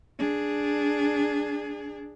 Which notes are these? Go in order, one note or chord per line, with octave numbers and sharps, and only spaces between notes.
D4 G#4